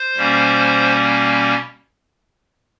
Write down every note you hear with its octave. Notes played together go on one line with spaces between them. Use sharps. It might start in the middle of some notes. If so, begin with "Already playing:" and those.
Already playing: C5
B2 G3 A#3 C#4